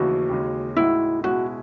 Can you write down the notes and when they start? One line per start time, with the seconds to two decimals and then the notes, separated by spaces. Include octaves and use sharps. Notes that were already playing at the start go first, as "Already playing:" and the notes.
Already playing: D#2 C#3 E3 A3 D#4 F#4
0.30 D#2 C#3 G#3 D#4
0.76 A2 G#3 D#4 E4 F#4
1.24 B2 G#3 C#4 E4 F#4